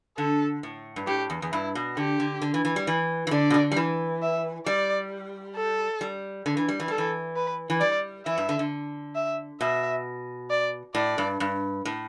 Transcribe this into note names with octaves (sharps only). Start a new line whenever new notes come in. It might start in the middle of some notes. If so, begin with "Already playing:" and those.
D3 A4
A2
G2
A2 G4
E2
E2
G2 E4
B2
D3 G4
D3
D3
E3
E3
G3
E3
E3
D3 D5
B2
D3
G3
E3
E5
G3 D5
A4
G3
D3
E3
G3
E3
G3 A4
E3
B4
E3
G3 D5
E3 E5
G2
D3
D3
E5
B2 E5
D5
A2 D5
G2
G2
A2